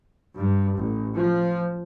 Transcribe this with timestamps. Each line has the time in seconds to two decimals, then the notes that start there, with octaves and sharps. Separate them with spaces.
0.34 G2
0.76 A1
1.16 F3